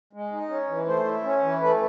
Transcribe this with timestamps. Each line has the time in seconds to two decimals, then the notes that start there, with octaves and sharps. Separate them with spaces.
0.13 G#3
0.32 D#4
0.49 C#4
0.68 E3
0.86 A3 C5
1.05 E4
1.24 C#4
1.42 E3
1.61 A3 B4